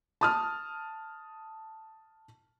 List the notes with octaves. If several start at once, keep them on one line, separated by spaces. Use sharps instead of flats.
A5 D#6 F6